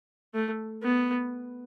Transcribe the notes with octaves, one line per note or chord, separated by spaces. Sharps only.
A3
B3